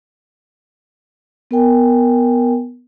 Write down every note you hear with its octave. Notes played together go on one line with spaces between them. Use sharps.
B3 A#4 G5 G#5